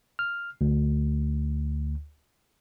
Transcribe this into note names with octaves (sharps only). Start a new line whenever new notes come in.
F6
D2